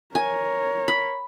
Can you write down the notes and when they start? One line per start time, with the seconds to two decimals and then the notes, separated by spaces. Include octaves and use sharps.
0.15 A#4 C#5 G#5
0.88 B5